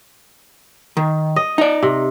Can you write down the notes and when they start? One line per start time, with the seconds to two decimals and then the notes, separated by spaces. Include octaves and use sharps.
0.97 D#3
1.36 D#5
1.58 D#4 D5
1.83 C3